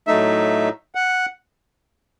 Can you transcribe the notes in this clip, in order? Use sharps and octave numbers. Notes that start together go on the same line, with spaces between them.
A2 F#3 A3 D#4 E5
F#5